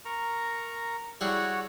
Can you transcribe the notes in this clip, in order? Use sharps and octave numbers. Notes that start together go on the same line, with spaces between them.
A#4 A#5 C#6
G3 E4 F#4 G#4 C#5 F#5